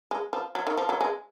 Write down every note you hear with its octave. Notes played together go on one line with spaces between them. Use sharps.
G#3
F3
F#3
D#3
F3
F#3
G#3